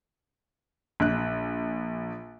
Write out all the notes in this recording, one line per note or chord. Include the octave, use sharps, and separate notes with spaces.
A#1 F#6